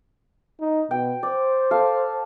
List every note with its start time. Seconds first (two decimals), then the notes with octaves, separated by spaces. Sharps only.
0.60 D#4
0.91 B2 G5
1.23 C5 D5
1.71 A4 F5